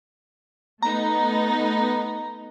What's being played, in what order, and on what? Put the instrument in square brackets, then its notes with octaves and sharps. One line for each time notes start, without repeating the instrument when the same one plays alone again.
[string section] A3 B3 D#4 [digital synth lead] A#5